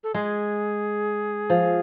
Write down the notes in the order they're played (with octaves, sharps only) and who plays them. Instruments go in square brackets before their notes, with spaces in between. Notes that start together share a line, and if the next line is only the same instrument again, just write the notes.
[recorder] A4
[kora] G#3 [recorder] G#4
[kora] F3